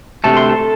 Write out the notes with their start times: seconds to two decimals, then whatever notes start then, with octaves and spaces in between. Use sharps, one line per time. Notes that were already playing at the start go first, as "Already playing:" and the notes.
0.24 D2 C3 A3 A5
0.37 C6
0.49 A4 A5